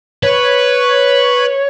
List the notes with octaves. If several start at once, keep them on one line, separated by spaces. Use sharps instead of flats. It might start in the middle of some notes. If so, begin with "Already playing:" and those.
B4 C#5